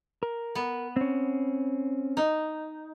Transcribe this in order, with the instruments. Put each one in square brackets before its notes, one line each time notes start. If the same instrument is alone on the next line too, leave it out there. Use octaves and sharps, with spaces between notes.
[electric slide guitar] A#4
[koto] B3
[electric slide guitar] C4 C#4
[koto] D#4